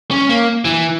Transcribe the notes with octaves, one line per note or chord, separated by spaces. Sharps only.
C#4
A#3
E3